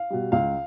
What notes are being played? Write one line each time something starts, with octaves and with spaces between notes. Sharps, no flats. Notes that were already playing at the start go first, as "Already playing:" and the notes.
Already playing: F5
B2 G3
C#2 F5